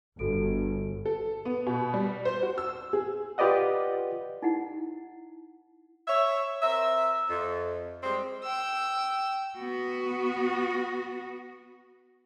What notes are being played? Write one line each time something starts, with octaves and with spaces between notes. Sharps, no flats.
G1 F#4 A4 D7
A4
B3
B2
G3
C5
F#4
E6
G#4
F4 G4 B4 D5 D#5 F#5
D#4 E4 F#5
C#5 E5
C4 A#4 E5
F2
G3 G#3 C4
G5 E6
B3 F#4